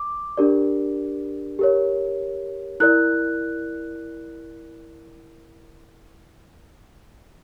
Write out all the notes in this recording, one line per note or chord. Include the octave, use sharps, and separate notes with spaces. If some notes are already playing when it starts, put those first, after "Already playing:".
Already playing: D6
D4 G4 A#4 D5
G4 A#4 C#5
E4 A#4 D5 F#6